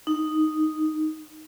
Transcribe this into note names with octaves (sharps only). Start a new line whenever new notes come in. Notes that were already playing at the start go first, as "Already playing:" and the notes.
D#4